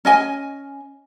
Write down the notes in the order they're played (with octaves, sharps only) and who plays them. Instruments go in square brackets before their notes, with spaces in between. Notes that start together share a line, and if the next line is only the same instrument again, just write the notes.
[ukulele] C#4 D#5 G#5